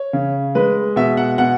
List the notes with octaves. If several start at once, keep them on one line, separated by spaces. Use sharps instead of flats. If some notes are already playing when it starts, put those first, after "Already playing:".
Already playing: C#5
C#3
G#3 B4
B2 E5
F#5
B2 F#5